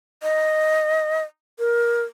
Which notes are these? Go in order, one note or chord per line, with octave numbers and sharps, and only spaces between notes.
D#5
A#4